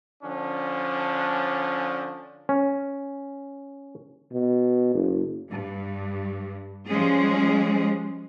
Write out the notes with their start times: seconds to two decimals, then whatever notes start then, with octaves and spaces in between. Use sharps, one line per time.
0.23 D3 F3 C#4 D4
2.49 C#4
4.32 B2
4.94 F#1
5.50 G2
6.88 F3 G3 G#3 C#4 G#4